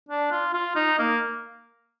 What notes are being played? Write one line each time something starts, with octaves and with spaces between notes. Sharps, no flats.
D4
F4
F4
D#4
A#3